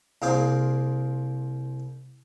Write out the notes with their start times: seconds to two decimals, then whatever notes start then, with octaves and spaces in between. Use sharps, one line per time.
0.22 C2 A#3 G#4 C5 D6